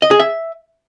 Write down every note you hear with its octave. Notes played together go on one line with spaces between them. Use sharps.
D#5
G#4
E5